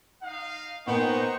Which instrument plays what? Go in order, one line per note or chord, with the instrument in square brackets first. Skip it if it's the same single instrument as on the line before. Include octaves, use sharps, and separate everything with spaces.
[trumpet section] D#4 F5
[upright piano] A#2 [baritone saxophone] B3 [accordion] D#4 C5 C#6 [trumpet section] D#5 F#5 G5